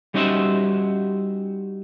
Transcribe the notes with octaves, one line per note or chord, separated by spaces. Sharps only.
G3 C#4 D#4 F#4 C5 E5